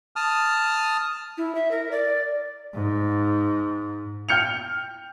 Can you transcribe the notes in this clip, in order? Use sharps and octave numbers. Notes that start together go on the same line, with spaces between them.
A5 D#6 F6
E4
E5
A#4
D5
G#2
G5 F6 G6 C#7 F7